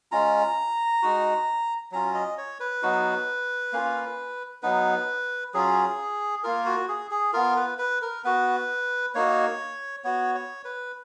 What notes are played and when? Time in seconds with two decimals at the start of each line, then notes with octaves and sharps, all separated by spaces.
0.12 G#3 C#4 F4 A#5
1.02 G#3 D#4 F#4
1.92 F#3 C#4 F4 A#5
2.14 D#5
2.38 C#5
2.60 B4
2.83 F#3 B3 D#4 F#4
3.73 A#3 C#4 F4
4.62 F#3 B3 D#4 B4
5.54 F#3 C#4 F4 G#4
6.44 A#3 F4 A#4
6.66 F#4
6.88 G#4
7.11 G#4
7.33 B3 F4 A#4
7.56 B4
7.78 B4
8.02 A#4
8.24 B3 F#4 B4
9.15 A#3 D#4 F#4 C#5
10.04 B3 F#4 C#5
10.35 C#5
10.65 B4